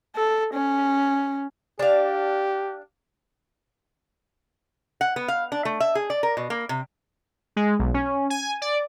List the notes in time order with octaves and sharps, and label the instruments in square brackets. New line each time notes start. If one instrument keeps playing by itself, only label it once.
[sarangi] A4
C#4
[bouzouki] D4 F5 [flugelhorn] G4
[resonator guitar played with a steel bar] F#5
B3
F5
D4
A3
E5
G#4
D5
A#4
B2
A#3
C3
[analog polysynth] G#3
B1
C#4
G#5
D5